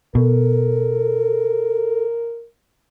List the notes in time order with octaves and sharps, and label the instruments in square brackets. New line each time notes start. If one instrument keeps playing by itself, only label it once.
[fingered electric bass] B2 [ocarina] A4 [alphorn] A#4